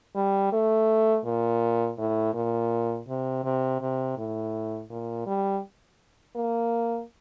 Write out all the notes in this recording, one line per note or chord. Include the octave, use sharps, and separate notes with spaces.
G3
A3
A#2
A2
A#2
C3
C3
C3
A2
A#2
G3
A#3